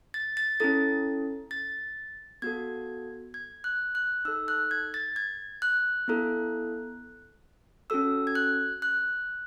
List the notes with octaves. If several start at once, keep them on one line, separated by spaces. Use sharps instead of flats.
A6
A6
C#4 E4 A4 A6
A6
B3 F#4 A4 G#6
G#6
F#6
F#6
D#4 A4 E6
F#6
G#6
A6
G#6
F#6
B3 E4 A4
C#4 F#4 A4 E6
G#6
F#6
F#6